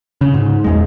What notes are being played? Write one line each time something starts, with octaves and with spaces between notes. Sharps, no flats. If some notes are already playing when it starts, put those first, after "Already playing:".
C#3
G#2
A#1 E2 G#3